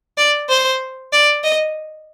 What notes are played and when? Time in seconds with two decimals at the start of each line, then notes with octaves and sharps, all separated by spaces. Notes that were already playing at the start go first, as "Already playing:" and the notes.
0.17 D5
0.49 C5
1.13 D5
1.44 D#5